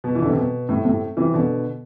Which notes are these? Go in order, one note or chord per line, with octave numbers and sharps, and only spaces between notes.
B2
E3
D3
C3
B2
A2 C3
A2 C3
C3 E3
B2 D3